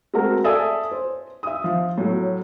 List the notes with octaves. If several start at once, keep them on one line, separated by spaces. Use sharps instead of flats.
G#3 A3 C4 F#4 A#4
A4 D5 E5 G#5 D#6
C5
E5 D#6
F3
A2 F#3